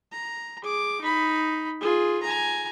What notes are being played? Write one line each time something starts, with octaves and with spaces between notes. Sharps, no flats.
A#5
G#4 D6
D#4 B5
F4 G#4
G#5 A#5